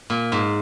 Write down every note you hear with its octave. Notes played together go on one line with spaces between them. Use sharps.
A#2
G#2